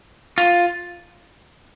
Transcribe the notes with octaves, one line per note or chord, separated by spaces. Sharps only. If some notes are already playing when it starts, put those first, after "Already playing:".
F4